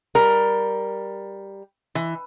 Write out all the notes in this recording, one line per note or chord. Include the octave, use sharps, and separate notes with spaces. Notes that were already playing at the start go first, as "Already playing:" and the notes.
G3 A#4
E3